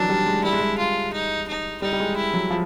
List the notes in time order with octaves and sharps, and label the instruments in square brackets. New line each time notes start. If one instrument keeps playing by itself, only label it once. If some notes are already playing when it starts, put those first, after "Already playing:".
Already playing: [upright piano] D#3 E3 F#3 [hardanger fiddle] D4
[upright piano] G3
G#3
[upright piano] G3 [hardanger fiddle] E4
[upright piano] G#3
G3
[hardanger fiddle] F4
D#4
D#4
[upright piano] G3 [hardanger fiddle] D#4
[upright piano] G3
G#3
[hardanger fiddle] E4
[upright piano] F#3
F3